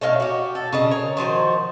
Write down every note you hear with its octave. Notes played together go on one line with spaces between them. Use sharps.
A3 C#4 D#4 F5
F#4 G4
A4
C#3 A4 D#5
A#4 C#5
D#3 F3 F#4 C5